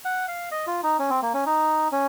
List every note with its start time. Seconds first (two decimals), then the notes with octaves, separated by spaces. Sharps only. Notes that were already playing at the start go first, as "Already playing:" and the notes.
0.05 F#5
0.28 F5
0.52 D#5
0.67 F4
0.83 D#4
0.99 C#4
1.10 C4
1.22 A#3
1.34 C#4
1.46 D#4
1.92 C#4